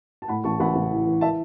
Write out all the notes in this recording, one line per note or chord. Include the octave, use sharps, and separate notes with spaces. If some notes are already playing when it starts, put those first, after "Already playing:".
A5
A2 F#5 B5
A1 A5 C#6
A1 F#5 B5
A1
E3
E3
E5 A5